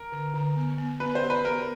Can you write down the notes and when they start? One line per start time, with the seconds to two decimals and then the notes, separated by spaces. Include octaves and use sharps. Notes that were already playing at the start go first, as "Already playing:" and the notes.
Already playing: A#4
0.12 D3
0.34 D3
0.56 B3
0.78 B3
1.00 B3 B4
1.15 C5
1.23 G4
1.30 B4
1.45 B3 A#4